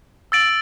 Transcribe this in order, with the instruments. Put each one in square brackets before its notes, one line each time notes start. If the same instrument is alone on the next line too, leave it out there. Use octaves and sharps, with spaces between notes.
[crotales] E6 A6 D7 F#7